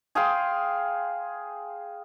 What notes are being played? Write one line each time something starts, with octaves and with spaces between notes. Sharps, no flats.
G#4 F5 G5 C6